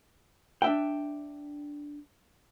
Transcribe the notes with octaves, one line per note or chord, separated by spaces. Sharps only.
D4 E5 G5